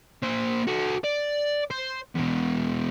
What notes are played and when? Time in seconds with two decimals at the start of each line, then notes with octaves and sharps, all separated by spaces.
0.23 A#3 C5
0.67 F#4 A4
1.04 D5
1.71 C5
2.15 E2 B2